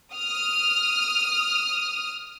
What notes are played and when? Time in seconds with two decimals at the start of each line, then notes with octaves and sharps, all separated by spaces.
0.14 D#6 F6